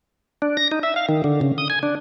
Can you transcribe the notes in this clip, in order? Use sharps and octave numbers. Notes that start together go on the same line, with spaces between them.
D4
A#6
D#4
E5
F5
D#3
D3
C#3
D#6
G#5
D4